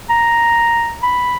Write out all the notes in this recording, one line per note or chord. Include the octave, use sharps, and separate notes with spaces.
A#5
B5